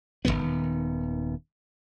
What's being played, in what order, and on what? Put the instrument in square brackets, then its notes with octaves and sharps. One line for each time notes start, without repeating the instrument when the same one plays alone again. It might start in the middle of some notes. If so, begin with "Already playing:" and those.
[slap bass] D#1 D#2 D#3 B3